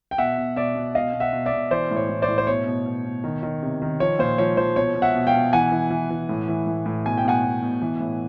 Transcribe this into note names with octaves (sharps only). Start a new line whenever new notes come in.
G5
B2 E5 F#5
B2
B2 D5 E5
B2
B2 D#5 F5
B2
E5 F#5
B2
D5 E5
B2
E3 C5 D5
A2
C#5
A2
C5 D5
A2
C5
B2 C#5
B2
B2
B2
D#3
D#3
C3
D#3
F3 C#5
A#2 C5
F3 C#5
F3 C5
B2 C#5
B2
E5 F#5
B2
F5 G5
B2
E3 F#5 G#5
E3
E3
E3
A2
E3
A2
A2
B2 G#5
G5
B2 F#5 G#5
B2
B2
E3
A2